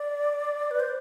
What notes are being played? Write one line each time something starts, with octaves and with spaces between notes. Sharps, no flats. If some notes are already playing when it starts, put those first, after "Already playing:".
Already playing: D5
B4
C5